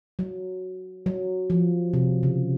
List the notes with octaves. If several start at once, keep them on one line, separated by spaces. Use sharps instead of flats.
F#3
F#3
F3
C3
C#3